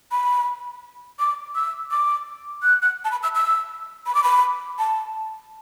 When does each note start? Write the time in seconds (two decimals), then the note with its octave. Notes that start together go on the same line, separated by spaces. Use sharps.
0.12 B5
1.19 D6
1.55 E6
1.91 D6
2.63 F#6
2.82 F#6
3.05 A5
3.11 B5
3.23 E6
3.35 E6
4.07 B5
4.15 D6
4.24 B5
4.79 A5